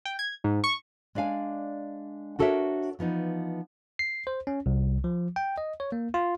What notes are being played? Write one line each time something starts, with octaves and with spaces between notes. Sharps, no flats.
G5
G#6
G#2
C#6
G#3 D4 D5 F5 G#5
D4 F#4 A4 A#4 C#5 E5
E3 F3 B3 D#4
C7
C5
C#4
C2
F3
G5
D#5
C#5
A#3
F4